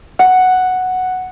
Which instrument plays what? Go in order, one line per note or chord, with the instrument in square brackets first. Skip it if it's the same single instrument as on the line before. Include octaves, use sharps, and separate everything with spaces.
[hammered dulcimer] F#5